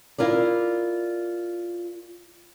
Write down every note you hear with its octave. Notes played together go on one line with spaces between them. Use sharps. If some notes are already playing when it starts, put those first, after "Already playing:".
E4 F4 A#4 D5